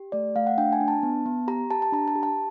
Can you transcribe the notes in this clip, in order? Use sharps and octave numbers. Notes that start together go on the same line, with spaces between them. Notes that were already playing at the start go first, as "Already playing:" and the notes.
Already playing: G4
A3 D5
A3 F5
F#5
D4 G5
G#5
D4
A5
B3
B3
G4 A#5
G4 A5
A5
D4 A#5
A5
G4
A5